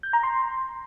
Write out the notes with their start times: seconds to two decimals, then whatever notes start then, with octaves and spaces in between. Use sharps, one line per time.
0.03 G6
0.13 A#5
0.23 C6